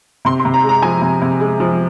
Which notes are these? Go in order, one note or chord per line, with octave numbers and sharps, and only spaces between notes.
C3 C6
C6
C3
A#5
G#3
A#5
F3 G#5
C3
C3
G#3
F3